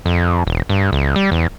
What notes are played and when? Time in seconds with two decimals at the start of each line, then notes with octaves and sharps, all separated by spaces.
0.06 F2
0.47 E1
0.69 G2
0.92 C#2
1.16 G3
1.32 E2